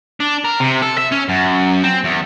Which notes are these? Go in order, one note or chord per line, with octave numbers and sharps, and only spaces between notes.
D4
A#4
C3
A4
E5
C#4
F#2
C4
E2